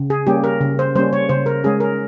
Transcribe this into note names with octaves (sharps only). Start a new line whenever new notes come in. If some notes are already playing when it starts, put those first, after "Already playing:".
Already playing: C#3
G#4
G3 A#3 C#4 G4
A#4
C#3
C5
G3 A#3 C#4 C5
C#5
C#3 C5
A#4
G#3 C#4 G#4
A#4